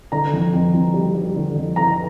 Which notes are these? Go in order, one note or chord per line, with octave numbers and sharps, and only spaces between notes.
D3 A#5
F2
F2
F2
G3
G3
D3
F2
D3 A#5